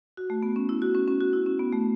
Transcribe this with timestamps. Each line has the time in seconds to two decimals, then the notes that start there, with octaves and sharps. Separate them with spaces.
0.17 F#4
0.30 A3
0.43 B3
0.56 C#4
0.69 E4
0.82 F#4
0.95 C#4
1.08 C#4
1.21 F#4
1.33 E4
1.46 C#4
1.59 B3
1.73 A3